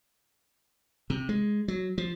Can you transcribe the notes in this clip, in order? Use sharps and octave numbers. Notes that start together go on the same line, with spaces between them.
C3
G#3
F#3
F3